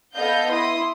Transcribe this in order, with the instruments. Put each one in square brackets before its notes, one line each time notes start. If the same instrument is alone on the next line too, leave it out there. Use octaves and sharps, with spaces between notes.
[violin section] B3 A4 D#5 F5 G6
E4 C6 D#6